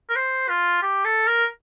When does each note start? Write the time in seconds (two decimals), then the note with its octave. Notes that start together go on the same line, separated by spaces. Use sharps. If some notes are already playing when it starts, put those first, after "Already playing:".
0.10 A#4
0.16 C5
0.49 F4
0.83 G4
1.05 A4
1.27 A#4